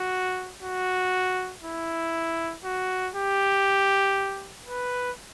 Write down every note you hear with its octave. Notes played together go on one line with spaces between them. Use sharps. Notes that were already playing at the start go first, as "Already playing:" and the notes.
Already playing: F#4
F#4
E4
F#4
G4
B4